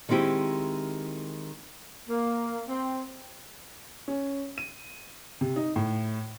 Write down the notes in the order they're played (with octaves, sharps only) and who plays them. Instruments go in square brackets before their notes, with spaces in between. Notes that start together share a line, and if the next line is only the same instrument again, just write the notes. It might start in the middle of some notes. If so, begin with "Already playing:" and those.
[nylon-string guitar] D#3 G#3 C4 E4 G4
[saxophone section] A#3
C4
[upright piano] C#4
D#7
C3
D#4
A2